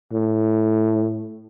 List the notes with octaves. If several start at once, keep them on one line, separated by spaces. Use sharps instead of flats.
A2